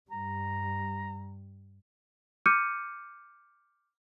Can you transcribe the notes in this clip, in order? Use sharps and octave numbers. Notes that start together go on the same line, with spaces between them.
G2 G3 A#5
D6 F6 G6 C#7 D#7